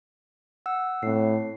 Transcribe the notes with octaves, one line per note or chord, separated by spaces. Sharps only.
F#5 E6
A2 C4 C7